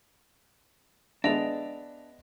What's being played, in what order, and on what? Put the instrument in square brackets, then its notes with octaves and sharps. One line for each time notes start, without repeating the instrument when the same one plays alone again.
[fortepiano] G#3 B3 E5 [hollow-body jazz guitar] D4 [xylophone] D#5 F7